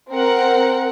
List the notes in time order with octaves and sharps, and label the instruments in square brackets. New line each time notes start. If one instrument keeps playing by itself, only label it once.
[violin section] C4 A#4 F#5